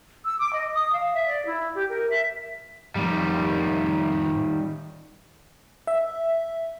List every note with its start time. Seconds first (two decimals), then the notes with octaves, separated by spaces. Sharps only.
0.23 E6
0.38 D6
0.53 D#5
0.72 D#6
0.92 F5
1.13 E5
1.25 D5
1.45 E4
1.74 G4
1.88 A#4
2.10 E5
2.96 F2 A2 D#3 G3
5.87 E5